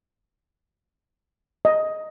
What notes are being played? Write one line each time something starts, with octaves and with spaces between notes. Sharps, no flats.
D#5